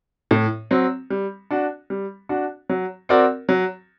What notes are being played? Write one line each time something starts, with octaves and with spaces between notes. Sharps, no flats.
A2
F#3 C4
G3
D4 F#4
G3
D4 F#4
F#3
C4 F#4 A#4 D5
F#3